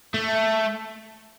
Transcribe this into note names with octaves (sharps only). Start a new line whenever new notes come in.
A3